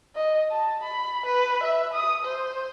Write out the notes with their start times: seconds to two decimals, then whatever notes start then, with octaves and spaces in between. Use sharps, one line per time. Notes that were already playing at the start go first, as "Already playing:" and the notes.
0.15 D#5
0.51 A5
0.83 B5
1.26 B4
1.63 E5
1.93 D#6
2.25 C5